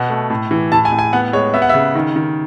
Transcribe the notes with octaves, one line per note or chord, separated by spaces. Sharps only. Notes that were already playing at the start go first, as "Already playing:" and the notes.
Already playing: B2 F#5
A3
A2
E3
A2 A5
G#5
A2
G#5
B3 F#5
G#3 C#5
B3 E5
F#5
C#3 E5
D#3
D#3